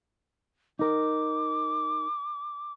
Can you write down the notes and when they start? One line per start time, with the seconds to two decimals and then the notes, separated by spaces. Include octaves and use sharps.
0.79 D#4 A#4 D6